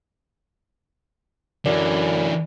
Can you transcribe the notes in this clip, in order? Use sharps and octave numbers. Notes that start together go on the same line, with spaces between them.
F#2 D3 E3 D5